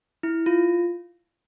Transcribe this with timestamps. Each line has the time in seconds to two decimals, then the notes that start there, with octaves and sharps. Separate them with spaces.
0.23 E4
0.46 F4